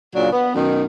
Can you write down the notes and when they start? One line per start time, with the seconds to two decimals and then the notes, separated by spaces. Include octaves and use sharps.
0.15 A#2 C#3 F#3 D4
0.32 B3
0.55 F#2 B2 D#3